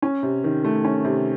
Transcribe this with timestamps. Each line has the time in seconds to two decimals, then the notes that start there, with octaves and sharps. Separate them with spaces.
0.02 C#4
0.23 C3
0.44 D#3
0.64 A3
0.85 C#4
1.05 C3